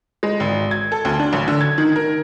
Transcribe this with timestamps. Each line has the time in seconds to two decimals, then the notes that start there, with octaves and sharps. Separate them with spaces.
0.23 G#3
0.40 G#1
0.71 G#6
0.92 A4
1.05 D2
1.20 D4
1.33 A1
1.48 D3
1.61 G#6
1.78 D#3
1.96 A#4